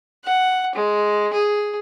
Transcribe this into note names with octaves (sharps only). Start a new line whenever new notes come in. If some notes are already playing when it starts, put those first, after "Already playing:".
F#5
G#3
G#4